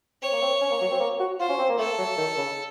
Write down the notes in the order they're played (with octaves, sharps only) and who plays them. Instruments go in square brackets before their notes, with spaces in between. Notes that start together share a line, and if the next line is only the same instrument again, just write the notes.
[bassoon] C4 [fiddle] C#5
[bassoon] A#3
C4
C#4
A#3
F#3
C4
A#3
F#4
[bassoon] F4 [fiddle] C5
[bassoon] C#4
C4
A#3
[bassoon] A3 [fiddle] A4
[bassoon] F#3
D#3
C#3